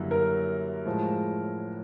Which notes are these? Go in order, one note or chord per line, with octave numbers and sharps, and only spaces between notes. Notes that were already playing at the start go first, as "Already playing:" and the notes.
Already playing: F#2 D3 G3 A#3 E4
A#4
A2 F3 G#3